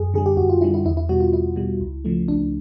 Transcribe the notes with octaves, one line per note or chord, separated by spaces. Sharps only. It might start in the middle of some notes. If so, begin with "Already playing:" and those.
Already playing: F#2 G#4
D3 G3 G#4
G4
F#2 F#4
F4
D3 G3 E4
E4
E2 E4
E4
B2 G3 F#4
F4
E2 E4
B2 G3
C#2
C#3 F3 A3
C#2 D4